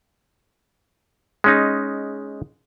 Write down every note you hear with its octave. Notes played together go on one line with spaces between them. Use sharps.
G#3 C#4 D#4